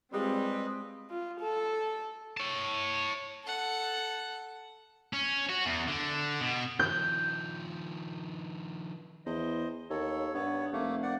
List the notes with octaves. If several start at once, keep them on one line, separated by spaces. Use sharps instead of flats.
G3 G#3 C4 F4 G#4 B4 D#5
F4
A4
C#5 A5
A4 F#5
C#4
F#4
E2
D3
B2
D#3 F3 G6
E2 C5 D#5
D#2 A4 C#5
G2 B3 C#5
F1 A3 A#3
A#3 D5 F#5